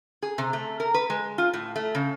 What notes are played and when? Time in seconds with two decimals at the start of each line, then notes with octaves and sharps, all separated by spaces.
0.23 G#4
0.38 C3
0.53 A3
0.80 A#4
0.94 B4
1.10 G#3
1.38 F4
1.54 A2
1.76 A3
1.95 C#3